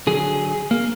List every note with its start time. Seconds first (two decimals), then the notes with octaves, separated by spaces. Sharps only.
0.07 D3 F#3 G#4
0.71 A#3